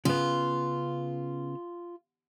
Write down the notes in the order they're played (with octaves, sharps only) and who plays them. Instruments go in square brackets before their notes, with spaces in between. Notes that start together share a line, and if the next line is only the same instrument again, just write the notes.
[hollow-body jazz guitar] C#3 B3 [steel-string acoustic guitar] F4